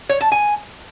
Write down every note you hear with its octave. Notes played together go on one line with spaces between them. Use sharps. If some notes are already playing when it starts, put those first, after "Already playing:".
C#5
A5
G#5